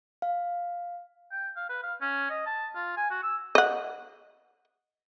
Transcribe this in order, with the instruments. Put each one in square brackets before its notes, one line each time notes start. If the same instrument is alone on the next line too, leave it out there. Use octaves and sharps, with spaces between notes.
[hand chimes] F5
[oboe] G5
F5
B4
F5
C#4
D#5
A5
F4
G#5
F#4
E6
[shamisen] D#5 F#5